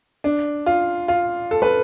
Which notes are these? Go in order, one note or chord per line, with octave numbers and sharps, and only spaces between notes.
D4
F4
F4
A4
B4